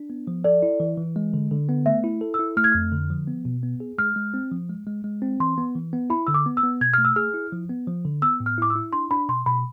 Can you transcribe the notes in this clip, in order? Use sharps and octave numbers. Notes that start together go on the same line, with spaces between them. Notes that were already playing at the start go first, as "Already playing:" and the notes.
Already playing: D4
B3
F3
A4 D5
E4
E3
E3
G#3
D3
D3
B3
A3 E5
E4
A4
E6
E4
A3 F6
G#6
F2 F6
D3
F3
B3
B2
B3
G#4
G#3 F6
G#3
C4
F3
G#3
G#3
G#3
C4
E3 C6
B3
E3
B3
E4 B5
D3 E6
D6
B3
E6
B3
B2 G#6
A3 F6
E6
G#4 F6
E4
F3
B3
F3
D3
B3 E6
A2
F6
E4 D6
E6
E4
D4 C6
D4 B5
B2 C6
B2 B5